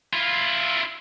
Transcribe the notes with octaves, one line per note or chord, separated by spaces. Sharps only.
E4 F4